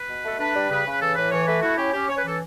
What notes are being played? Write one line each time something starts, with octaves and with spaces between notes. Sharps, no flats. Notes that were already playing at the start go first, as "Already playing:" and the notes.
Already playing: B4
B2
A3 A4
D4 B4
G3
C#3 B4
C#3
E3 A4
A2 B4
E3 C#5
A3 B4
E4 F#4
C#4 G4
C#4 G4
C#4 C#5
B4
E3 A4